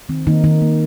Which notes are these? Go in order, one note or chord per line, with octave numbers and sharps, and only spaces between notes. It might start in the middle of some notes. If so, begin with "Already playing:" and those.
D#3 C4
D#3 A#3 D#4
D#3 D#4
A#3